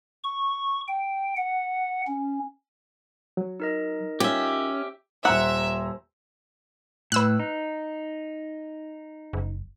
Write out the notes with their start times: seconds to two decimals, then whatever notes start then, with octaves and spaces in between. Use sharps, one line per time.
0.24 C#6
0.87 G5
1.37 F#5
2.07 C#4
3.37 F#3
3.60 D#4 A#4 D#5
4.20 C#4 F4 G4 E5
5.25 D#1 C5 E5 F#5 A#5 E6
7.12 A2 B4 E6 F#6
7.40 D#4
9.33 F#1